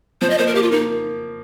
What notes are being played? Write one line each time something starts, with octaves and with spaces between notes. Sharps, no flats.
F3 C5
D#5
A#3 C5
A#4
A#3 G4
F4
A#3 D#4